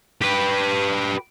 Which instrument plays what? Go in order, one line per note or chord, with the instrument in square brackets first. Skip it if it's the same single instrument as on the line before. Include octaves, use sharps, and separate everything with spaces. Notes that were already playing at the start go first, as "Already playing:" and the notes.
[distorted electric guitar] G4 B4